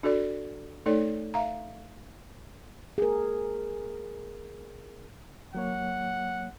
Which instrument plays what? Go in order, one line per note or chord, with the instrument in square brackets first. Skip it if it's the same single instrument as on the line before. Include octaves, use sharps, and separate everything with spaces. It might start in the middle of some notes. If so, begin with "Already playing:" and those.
[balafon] D4 F#4 A4 D5
A3 D#4 A4 C#5 D5
E5 F5 A#5
[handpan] G#4 A#4
[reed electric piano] F#3 A#3 C#5 [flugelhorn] F#5